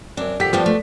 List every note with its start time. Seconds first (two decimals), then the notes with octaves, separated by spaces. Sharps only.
0.17 F#2 C4 D4
0.40 A#1 D#2 G4 A4 F#5 B6
0.53 F3 G3 A3 B3 D4 G4 G5
0.66 A3